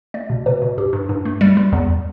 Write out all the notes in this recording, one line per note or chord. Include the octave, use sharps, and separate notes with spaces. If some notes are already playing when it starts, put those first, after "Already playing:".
A3 D5
B2
B2 B4
B2
G2 G4
G2
G2
A3
G3 D5
G3
E2